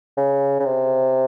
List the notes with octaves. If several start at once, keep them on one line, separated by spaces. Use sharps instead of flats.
C#3
C#3
C3